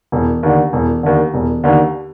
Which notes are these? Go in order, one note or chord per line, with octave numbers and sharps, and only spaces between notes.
E1
D#2 D3
E1
D#2 D3
E1
D#2 D3